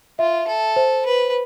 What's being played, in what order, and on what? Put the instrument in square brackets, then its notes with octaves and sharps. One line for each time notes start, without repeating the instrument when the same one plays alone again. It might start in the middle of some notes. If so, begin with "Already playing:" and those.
[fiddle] F4 [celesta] E5
[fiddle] A4
[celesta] C5
[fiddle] B4